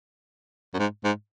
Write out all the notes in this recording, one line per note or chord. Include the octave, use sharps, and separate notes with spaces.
F#2
G#2
G#2